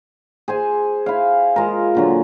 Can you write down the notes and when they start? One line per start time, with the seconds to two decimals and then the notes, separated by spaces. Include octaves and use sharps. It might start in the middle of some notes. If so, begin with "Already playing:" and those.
0.48 G#4 C5 G#5
1.06 E4 F5
1.56 G#3 F4 A#4
1.95 A#2 D3 F#3